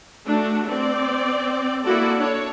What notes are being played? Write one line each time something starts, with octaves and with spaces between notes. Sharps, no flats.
A3 D4 F#4
C4 D5
A#3 E4 F#4 A4 D5
D4 C#5